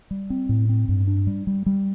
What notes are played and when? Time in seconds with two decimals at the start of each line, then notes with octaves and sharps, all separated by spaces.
0.11 G3
0.30 C4
0.49 A2
0.69 C4
0.89 G2
1.07 D4
1.27 G3
1.47 G3
1.66 G3